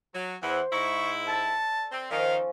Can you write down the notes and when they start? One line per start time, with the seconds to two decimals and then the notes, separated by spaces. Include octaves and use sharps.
0.15 F#3
0.43 E2 E3 C5 F#5
0.73 G#2 E4 A#5 C#6
1.28 A4 D5 A5
1.92 C4
2.11 D#3 F3 C#4 F5